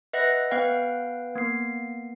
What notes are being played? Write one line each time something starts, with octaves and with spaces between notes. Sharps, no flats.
B4 D#5 E5 F#5 F#6 A#6
B3 B4 F5 G5
A#3 B3 C7